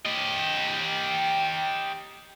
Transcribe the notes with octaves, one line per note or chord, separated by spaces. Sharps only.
G4 D#5